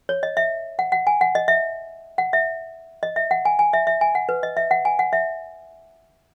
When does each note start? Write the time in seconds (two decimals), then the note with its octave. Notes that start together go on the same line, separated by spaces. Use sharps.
0.09 C#5
0.23 D#5
0.37 E5
0.79 F#5
0.92 F#5
1.07 G#5
1.21 F#5
1.35 D#5
1.48 E5
2.18 F#5
2.33 E5
3.03 D#5
3.16 E5
3.31 F#5
3.45 G#5
3.59 G#5
3.73 E5
3.87 E5
4.01 G#5
4.15 F#5
4.29 B4
4.43 D#5
4.57 E5
4.71 F#5
4.85 G#5
4.99 F#5
5.13 E5